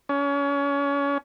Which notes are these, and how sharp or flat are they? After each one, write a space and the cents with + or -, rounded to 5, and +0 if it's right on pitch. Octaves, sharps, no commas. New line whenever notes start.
C#4 +30